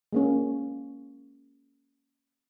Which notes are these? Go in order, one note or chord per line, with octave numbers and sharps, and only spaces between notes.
G#3 A#3 C#4